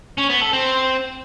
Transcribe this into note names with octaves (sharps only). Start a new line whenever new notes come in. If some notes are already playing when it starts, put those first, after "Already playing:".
C#4
B3
A4
C4